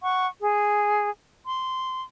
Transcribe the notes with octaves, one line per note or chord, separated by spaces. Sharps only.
F#5 C#6
G#4
C6